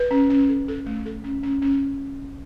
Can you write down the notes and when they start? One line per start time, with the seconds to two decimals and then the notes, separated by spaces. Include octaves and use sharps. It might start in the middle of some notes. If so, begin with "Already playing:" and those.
Already playing: B4
0.11 C#4
0.30 C#4
0.49 A4
0.68 A4
0.86 A3
1.06 A4
1.24 C#4
1.43 C#4
1.62 C#4